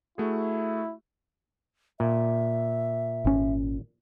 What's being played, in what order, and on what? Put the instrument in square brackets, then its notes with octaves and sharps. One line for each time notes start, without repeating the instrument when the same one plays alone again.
[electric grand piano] A3 F#4 G#4 [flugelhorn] E4
[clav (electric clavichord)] A#2 [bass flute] E5
[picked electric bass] G#1 C#4